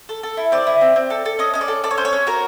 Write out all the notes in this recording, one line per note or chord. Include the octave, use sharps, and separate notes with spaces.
A4
A4
E4
C4 D5
E4
C4
C4
A4
A4
C#4 D#5
C#4 D#5
D5
A4
A4 D5
C#5
C#4 C5
C#5
C#4
F#4 A#4